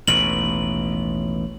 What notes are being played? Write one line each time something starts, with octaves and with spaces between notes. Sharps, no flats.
A1 D#2 B2 F#7